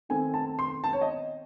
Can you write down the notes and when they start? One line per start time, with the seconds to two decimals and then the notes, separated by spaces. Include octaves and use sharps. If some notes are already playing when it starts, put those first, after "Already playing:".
0.09 D#3 A3 C4 G#5
0.34 A5
0.59 C6
0.84 A5
0.93 C#5
1.01 D#5